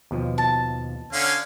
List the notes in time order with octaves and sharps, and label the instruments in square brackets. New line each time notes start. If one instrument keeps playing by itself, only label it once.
[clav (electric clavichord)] D#2 B2 F3
[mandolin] A5
[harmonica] D3 C#4 F5